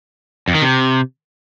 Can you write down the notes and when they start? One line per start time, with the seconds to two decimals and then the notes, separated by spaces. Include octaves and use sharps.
0.48 F2
0.55 D#3
0.62 C3